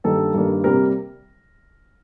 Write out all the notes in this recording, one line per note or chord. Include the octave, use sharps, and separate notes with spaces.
G2 D#3 A#3 A4
G2 D#3 A#3
C3 G3 A#3 A#4